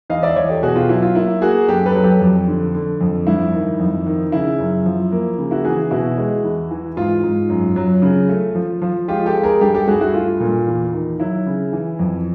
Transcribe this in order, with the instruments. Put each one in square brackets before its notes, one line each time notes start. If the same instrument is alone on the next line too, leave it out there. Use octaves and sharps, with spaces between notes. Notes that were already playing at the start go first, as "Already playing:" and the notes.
[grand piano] E2 D#5 F5
D5 E5
E2 C#5 D#5
G4 A4
B2 F#4 G#4
F4 G4
F#3 E4 F#4
F4
A#3 E4
A#3 F#4 G#4
F#2 G4 A4
A4 B4
F#3
G4 A4
F2
D3
D3
F2
G2 E4
D#3
F2
D#3
C#3 E4
F#2
F3
A#3
C#3
E4 F#4
E3 F#4 G#4
B2 E4 F#4
G#3
E2
E3
G#2 F4
G#2
F#2
F#3
C#3
A3
F3
F3
G#3 F4 G4
G4 A4
G#3
G#4 A#4
G2 G4 A4
G4 A4
G2 F#4 G#4
E4 F#4
A3 F4
A#2
E2
D#3
F#3 E4
C#3
E3
F2